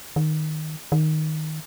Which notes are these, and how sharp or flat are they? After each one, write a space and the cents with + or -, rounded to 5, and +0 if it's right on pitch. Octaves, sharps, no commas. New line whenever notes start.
D#3 -5
D#3 +0